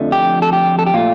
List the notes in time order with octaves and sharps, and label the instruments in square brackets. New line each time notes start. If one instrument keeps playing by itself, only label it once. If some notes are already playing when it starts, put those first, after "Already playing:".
Already playing: [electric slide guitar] F2 D3 F3 A3
G4
A4
G4
A4
G4
A#2 A3 F4